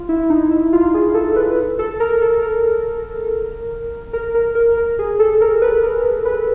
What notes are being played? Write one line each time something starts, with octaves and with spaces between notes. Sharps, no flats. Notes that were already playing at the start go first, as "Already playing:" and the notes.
Already playing: F4
E4
D#4
E4
F4
G#4
A4
B4
A4
A#4
A4
A#4
A#4
A#4
A#4
A#4
G#4
A4
A#4
B4
A#4
B4